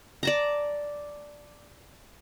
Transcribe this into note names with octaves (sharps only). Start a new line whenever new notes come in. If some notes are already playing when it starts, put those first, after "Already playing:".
D5 A5 A#5